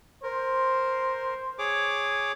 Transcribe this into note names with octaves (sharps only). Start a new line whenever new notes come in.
A#4 C5
G#4 C#5 D6